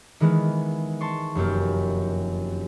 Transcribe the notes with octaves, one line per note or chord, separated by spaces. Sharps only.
D#3 E3 G#3 B3
A5 C6 C#6
F1 F#2 A#3 G4